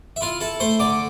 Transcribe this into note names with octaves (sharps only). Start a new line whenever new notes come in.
E5
E4 F4 F5
E4 A4 A5
A3 C5 C6
D3 D5 D6